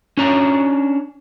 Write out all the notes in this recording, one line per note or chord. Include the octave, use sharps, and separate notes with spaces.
C#4 D4 C#5 A#5